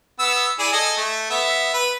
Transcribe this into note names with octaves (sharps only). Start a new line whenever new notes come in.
B3 E6
E4 G#4 D5
A4 D#5 G#5
A3
B3 E5
B4